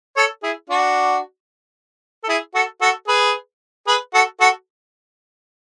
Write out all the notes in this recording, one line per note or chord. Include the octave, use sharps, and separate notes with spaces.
A4 C#5
E4 G#4
D4 F#4
A4
E4 G#4
F#4 A4
F#4 A4
G#4 B4
G#4 B4
F#4 A4
F#4 A4